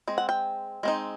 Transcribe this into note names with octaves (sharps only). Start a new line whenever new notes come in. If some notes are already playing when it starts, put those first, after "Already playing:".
G#3 C4
F#5
G5
G#3 C4 D#4